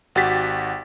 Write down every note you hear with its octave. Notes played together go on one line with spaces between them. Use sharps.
G#1 F#4 G4 A6 B6